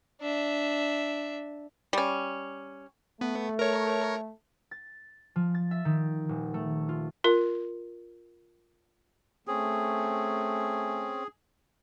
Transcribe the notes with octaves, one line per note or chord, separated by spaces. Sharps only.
D4 E5
G3 C#4
A3 B3
A#4 C#5
A6
F3
A6
E5
D#3
D#1
A3
F4
F4 A#4
A3 C4 C#4 G#4